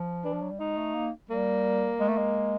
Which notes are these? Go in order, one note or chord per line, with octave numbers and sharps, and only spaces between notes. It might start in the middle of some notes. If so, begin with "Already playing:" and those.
Already playing: F3
E3 D4
F3
F#3
G3
G#3 D#4
A3
A#3
G3 A#3
G#3
A3
G#3